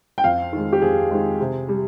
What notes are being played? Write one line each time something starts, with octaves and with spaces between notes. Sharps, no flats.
G5
F2 F5
D#3 G#3
G4
F2 G#4
D#3 G#3
C3
G3